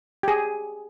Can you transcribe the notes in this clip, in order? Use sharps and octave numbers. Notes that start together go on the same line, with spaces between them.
G4 G#4